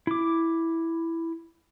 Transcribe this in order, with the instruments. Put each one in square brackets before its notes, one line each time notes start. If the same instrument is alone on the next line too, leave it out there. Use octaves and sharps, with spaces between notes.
[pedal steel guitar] E4 D6